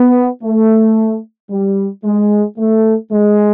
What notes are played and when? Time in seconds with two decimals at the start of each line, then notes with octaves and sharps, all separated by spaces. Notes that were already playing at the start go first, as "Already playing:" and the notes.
Already playing: B3
0.42 A3
1.50 G3
2.04 G#3
2.58 A3
3.12 G#3